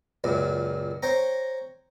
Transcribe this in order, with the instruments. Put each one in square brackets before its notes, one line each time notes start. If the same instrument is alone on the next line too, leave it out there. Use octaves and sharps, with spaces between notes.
[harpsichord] C#2 F#2 A#2
C5 C#5 G5 A#5